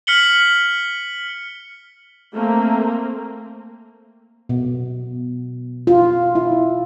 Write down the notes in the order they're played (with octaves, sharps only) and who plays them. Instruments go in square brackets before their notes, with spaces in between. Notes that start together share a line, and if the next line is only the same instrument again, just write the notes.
[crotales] F6 B6 C#7 F#7 G7
[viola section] A3 A#3 C4
[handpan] B2
F4
E4